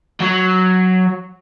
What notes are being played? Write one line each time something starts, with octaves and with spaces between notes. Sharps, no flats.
F#3